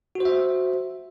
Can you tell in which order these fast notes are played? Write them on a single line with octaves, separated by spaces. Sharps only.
F#4 C5 E5